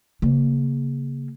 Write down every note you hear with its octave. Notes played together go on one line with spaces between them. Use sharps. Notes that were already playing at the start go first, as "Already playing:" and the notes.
C#3 A#3